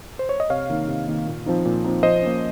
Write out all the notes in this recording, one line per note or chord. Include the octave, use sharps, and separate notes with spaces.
C5
C#5
D#5
C3 C#5 F5
D#3 A#3 D#4
C3
D#3 A#3 D#4
A#2
F3 C4 D#4
A#2
F3 C4 D#4
F3 C5 D#5
A#3 C#4